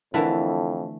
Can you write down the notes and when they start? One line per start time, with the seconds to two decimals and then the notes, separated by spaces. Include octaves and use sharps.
0.14 F2 D3 E3 A3 E4 A#4